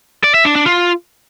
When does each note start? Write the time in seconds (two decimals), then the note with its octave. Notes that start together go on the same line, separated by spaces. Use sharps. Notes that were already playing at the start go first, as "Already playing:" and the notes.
0.24 D5
0.35 E5
0.45 D4
0.56 D4
0.66 F4